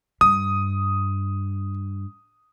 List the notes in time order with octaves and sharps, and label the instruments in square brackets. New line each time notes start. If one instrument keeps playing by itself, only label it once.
[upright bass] G2 [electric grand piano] D#6